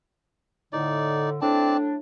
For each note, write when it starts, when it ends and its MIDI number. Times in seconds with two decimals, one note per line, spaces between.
0.73 1.35 45
0.73 1.35 50
0.73 1.30 63
0.73 1.30 74
1.41 1.98 45
1.41 1.77 60
1.41 1.98 62
1.41 1.77 74
1.41 1.77 81